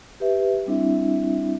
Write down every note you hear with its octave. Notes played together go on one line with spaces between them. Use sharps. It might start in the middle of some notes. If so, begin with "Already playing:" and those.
G4 B4 E5
G3 C4 D4 E4 E5